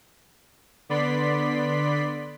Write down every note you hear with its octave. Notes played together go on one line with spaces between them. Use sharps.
D3 B3 D5 B5 C6 B6